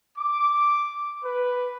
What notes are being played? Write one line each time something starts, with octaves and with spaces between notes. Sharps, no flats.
D6
B4